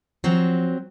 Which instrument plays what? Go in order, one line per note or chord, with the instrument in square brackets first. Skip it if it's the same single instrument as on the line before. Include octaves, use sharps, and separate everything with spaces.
[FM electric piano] F3 [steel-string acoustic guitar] F#3 C4